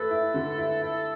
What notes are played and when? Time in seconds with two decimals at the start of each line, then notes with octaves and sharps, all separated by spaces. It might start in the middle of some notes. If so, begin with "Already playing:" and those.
Already playing: A3 A4 B4
0.11 E4
0.34 D3
0.58 E4
0.82 E4